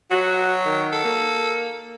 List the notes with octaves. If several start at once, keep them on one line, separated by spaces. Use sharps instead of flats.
F#3 F#4
D#3
A4
A#3